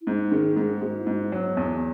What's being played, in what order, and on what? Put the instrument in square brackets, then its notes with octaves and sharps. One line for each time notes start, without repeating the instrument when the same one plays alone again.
[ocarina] E4
[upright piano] G#2 [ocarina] D#4
[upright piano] D#3 [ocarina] G#4
[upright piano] G#2 [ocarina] G#4
[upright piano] G#2 [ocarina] F#4
[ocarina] E4
[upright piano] G#2
[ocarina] D#4
[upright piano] F#3
[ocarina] B3
[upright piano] E2 [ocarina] B3